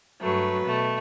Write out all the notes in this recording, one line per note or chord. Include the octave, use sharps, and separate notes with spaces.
G2 F#3 A3 B4
B2 A3